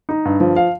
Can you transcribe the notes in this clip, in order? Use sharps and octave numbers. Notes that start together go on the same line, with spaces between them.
D#4
G2
F3
F5